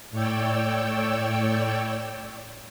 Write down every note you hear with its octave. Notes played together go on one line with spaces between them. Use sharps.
A2 C#5 D5 G5 E6